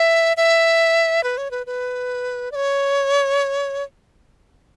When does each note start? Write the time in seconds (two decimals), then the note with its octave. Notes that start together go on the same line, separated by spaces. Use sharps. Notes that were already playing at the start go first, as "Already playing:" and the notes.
Already playing: E5
0.37 E5
1.24 B4
1.38 C#5
1.51 B4
1.66 B4
2.52 D5
2.55 C#5